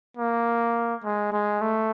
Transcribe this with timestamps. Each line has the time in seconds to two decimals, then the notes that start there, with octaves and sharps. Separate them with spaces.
0.17 A#3
1.04 G#3
1.33 G#3
1.61 A3